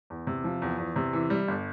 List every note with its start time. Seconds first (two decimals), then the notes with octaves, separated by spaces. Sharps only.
0.10 E2
0.27 C3
0.44 F3
0.62 E2
0.78 E2
0.96 C3
1.13 E3
1.30 G3
1.48 G1